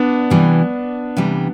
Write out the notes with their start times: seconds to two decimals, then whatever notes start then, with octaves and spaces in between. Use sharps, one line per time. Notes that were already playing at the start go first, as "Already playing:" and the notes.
Already playing: B3 D4
0.30 C3 E3 G3
1.17 C3 E3 G3